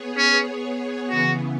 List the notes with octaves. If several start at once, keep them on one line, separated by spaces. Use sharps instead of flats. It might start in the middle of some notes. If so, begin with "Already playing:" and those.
Already playing: B3 G#4 C#5
C#4
C#3 E3 B3 F#4